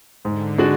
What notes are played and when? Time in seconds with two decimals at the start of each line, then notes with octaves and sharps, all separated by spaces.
0.24 G#2 D3
0.58 G#3 D4 F#4